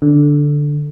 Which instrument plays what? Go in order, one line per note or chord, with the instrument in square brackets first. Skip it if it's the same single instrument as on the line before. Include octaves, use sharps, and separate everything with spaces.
[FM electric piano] D3